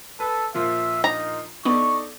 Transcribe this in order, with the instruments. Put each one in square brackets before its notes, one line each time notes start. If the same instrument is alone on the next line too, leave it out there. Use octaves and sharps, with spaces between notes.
[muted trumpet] A4 [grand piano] B4
[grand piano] A#2 F3 F4 [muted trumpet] E5
[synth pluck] D4 [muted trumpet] D#4 [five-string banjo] A#5
[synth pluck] B3 D4 [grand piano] D#4 A4 D5 [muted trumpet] C#6